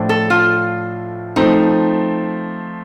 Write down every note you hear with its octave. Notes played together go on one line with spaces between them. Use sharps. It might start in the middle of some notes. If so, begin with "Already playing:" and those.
Already playing: A2 F3 A3 D4
A4
F4
F3 A3 C4 D#4